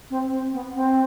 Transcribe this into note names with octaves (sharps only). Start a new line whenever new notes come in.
C4
C4
B3
C4